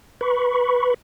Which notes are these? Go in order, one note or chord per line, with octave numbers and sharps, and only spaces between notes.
B4 B5 C#6